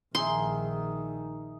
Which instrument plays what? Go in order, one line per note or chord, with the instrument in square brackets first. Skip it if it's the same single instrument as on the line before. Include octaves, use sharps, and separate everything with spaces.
[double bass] A#1 D#3 [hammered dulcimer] D#4 G#4 E5 [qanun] C6